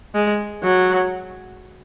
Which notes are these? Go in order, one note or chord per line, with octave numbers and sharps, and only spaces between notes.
G#3
F#3